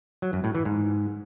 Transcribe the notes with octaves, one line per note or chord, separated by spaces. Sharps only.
F#3
F#2
A2
E3
G#2